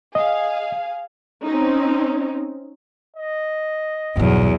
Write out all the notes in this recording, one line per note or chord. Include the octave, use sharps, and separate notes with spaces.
G#4 D#5 F5
C4 C#4 D#4
D#5
B1 E2 G2 F#3